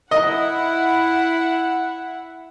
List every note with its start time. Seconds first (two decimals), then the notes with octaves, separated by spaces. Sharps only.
0.11 E4 D#5 F#5